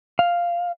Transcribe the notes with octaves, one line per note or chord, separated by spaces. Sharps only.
F5